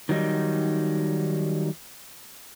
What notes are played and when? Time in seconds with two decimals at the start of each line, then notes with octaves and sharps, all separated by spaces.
0.09 D#3 F#3 G3 D#4